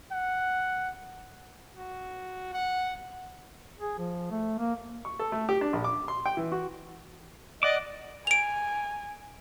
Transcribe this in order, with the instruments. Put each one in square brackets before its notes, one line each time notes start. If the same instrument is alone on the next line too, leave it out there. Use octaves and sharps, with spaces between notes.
[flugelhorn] F#5
[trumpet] F#4
F#5
[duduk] G#4
F3
A3
A#3
[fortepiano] C#6
A4
A3
G4
D4
A#1
D6
C6
G5
E3
F#4
[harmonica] D5 D#5 [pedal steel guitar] F#5 D6
[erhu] G#5 [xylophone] D7 F7